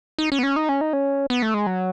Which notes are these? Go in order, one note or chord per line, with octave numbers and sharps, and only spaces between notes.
D#4
C#4
B3
C#4
D#4
C#4
D#4
C#4
B3
A3
G#3
F#3